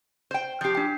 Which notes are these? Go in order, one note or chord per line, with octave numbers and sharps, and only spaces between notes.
C5 G5
F3 G4 G6 C7
D4 G5